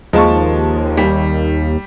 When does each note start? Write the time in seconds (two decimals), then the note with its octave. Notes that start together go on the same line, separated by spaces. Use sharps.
0.13 D#2 F3 G#3 A5 C#6
0.97 G3